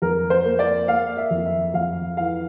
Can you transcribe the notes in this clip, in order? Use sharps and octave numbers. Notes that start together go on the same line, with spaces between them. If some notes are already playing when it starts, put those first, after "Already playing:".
F2 A#4
C5
A#3
D5
A#3 F5
E5
F2
E5
F2 F5
E3 F5